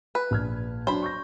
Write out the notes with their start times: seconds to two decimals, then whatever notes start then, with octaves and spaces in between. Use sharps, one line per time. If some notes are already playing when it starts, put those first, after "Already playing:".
0.15 B4
0.31 A#1 F6 G#6
0.87 F#3 D4 C5 B5
1.02 C#6 G6 A#6